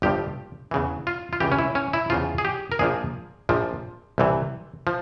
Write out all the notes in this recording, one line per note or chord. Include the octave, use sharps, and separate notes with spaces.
G1 G2 F3 G4
E2 C#3 E3
F4
F4
C#2 C#3 E3 G4
C#4
E4
C#4
E4
E2 C#3 F3 F4
G#4
G4
A#4
A#1 A#2 F3 G#4
A#1 A#2 F3
C2 C3 E3
F3